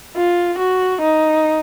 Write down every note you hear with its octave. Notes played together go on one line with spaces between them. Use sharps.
F4
F#4
D#4